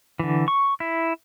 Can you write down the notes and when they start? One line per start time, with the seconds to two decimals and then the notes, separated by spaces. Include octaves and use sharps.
0.19 D3 E3
0.48 C#6
0.80 E4